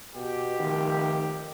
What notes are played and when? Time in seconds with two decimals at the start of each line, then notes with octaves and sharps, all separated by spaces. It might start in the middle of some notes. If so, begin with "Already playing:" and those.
0.15 B2 G4
0.59 F1 D#3